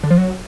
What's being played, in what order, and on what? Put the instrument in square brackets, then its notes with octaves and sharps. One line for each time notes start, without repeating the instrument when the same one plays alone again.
[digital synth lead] D3
F3
F#3